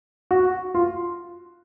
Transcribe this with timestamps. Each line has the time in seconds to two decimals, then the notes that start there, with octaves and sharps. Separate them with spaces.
0.31 F#4
0.75 F4